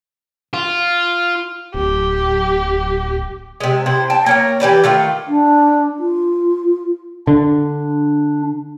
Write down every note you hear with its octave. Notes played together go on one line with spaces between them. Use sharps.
F4
D1 G4
C3 G#3
C3 E4 C5
G5 A5
A#3 C#4 A#4
E3 G4 B4 D5
D#3 A3 F4
D4
F4
D3 D4